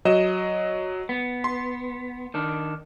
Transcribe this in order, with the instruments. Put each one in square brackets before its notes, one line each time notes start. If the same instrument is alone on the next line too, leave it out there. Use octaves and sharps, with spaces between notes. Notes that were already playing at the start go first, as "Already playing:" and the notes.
[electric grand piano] F#3 D#5 E7
[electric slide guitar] B3
[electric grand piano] C6
[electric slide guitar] D#3 D4